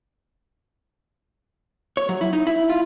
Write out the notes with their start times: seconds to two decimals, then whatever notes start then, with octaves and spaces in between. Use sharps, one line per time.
1.97 C#5
2.09 F#3
2.21 E4
2.33 D#4
2.47 E4
2.70 F4